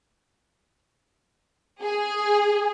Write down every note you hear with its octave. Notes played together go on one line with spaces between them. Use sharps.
G#4